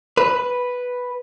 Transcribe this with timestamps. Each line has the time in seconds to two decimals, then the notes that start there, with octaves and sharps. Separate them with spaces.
0.17 B4